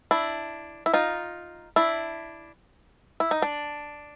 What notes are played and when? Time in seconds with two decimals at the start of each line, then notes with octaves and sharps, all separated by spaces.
0.11 D4 E4
0.86 E4
0.94 D#4 F4
1.76 D4 E4
3.20 E4
3.31 D#4
3.42 D4